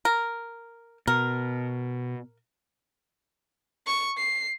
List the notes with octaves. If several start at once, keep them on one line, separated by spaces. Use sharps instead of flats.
A#4
B2 A#4
C#6
C7